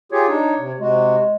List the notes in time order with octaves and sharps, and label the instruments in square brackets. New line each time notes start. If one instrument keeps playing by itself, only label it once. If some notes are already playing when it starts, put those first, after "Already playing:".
[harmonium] F4 G4 G#4 [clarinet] C#5
[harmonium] D4 D#4
C3
[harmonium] C3 F#4 [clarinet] G#3